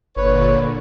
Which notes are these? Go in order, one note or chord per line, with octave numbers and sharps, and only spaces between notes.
G1 A#2 D3 B4 C#5